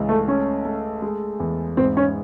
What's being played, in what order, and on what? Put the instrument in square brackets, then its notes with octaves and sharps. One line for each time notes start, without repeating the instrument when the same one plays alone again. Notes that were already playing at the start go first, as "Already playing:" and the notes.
Already playing: [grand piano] C#2 G#2 E3
[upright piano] A3
[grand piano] A3 [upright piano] C#4
[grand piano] A3
G#3
E2
[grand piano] G#2 [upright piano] C4
[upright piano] C#4